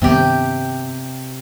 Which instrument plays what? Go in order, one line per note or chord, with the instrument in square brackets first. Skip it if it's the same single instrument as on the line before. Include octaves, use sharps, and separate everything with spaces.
[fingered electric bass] G2 D#3 B3 [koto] C3 G4